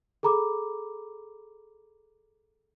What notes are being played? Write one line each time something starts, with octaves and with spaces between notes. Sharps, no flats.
G#4 A4 A#5 B5 D6